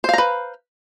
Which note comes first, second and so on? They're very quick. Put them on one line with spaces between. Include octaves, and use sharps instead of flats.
C5 F5 A#5 B4